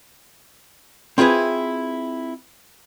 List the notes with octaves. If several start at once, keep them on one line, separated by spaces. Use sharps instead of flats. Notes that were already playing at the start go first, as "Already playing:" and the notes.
C4 E4 F4 G#4 B4